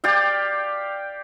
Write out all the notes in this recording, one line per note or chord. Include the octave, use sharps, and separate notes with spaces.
G4 D5 F5 G5